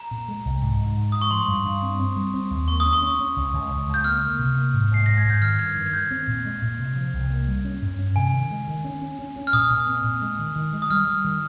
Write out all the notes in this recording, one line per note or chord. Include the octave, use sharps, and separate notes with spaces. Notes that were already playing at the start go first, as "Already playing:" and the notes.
Already playing: A#5
A#2
G#3
C2
G#2
G#2
G#2
G#2 D#6
C#6
F3 C6
G2
G2
C4
C4
G3
C4
D#2
A#3 C#6
C#4 D#6
C#6
C#4
C#4
C#2
C#2
C#2
C#2
G6
A#3 F6
A#3
C3
A#3
G#2
G#2 C7
G#2 A#6
G#6
G#2
G6
D#3 F6
G2 G#6
D#3
G#6
G2 G6
C4
A#2
G#3
A#2
C3
F3
C2
A#3
G3
C#4
G2
C#4
C3 G#5
D#3
G#3
D#3
C#4
C#4
C#4
C#4
F6
A#2 D#6
A#2
C4
A#2
G#3
D#3
D#3
G#3
D#6
G3 F6
G3
D#3